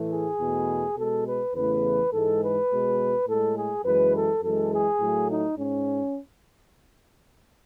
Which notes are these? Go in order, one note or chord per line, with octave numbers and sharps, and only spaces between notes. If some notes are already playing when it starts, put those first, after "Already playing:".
Already playing: A2 E3 A3
G#4
E2 B2 A3
B2 G#3 A4
B4
E2 C#3 E3 A3 B4
G#2 E3 G#3 A4
B4
B2 G#3
A2 G#3 A4
G#4
F#2 E3 G#3 B4
A4
F#2 E3 G#3 A4
G#4
A2 F#3 A3
D#4
G#2 C#4